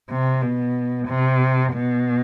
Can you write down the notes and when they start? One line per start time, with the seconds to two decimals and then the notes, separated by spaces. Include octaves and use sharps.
0.10 C3
0.42 B2
1.07 C3
1.73 B2